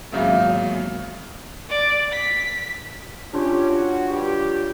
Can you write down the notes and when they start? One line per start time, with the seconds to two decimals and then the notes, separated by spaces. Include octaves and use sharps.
0.12 G#1 E2 A#2 C#3 F#3 A#3 E5 F5
1.69 D5
2.12 B6
3.34 C#4 D4 F4 G4 C#5
3.70 F#4
4.10 G2 G4